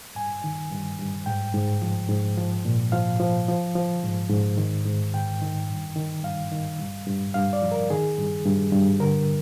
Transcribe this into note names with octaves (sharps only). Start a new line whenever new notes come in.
G2 G#5
D#3
G2
G2
G#2 G5
G#2
F3
G#2
F3
A#2
F3 F5
F3
F3
F3
G#2
G#2
D#3
G#2
D#3 G5
D#3
G2
D#3
G2 F5
D#3
G2
G2
G2 F5
D5
F3
A#4
D#3 G#4
G2
G2
G2
D3 A#4